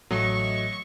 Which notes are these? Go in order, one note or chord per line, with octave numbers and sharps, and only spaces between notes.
A1 F#3 A3 D#5 C#6